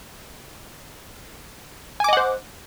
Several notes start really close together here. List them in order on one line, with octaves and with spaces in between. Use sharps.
G#5 D6 D#5 F#5 C5